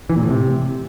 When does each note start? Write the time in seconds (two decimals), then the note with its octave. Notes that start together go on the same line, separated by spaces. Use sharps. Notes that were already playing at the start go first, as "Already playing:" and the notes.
0.10 E3
0.16 A#2
0.23 A2
0.29 C3